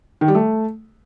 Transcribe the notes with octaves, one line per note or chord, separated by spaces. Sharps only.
D#3
G3
A3